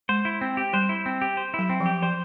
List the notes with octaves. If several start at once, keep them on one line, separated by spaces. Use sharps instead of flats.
G#3 C5
E4
C4
G4
G3 C5
E4
C4
G4
C5
F#3 E4
C4
F3
G4
F3 C5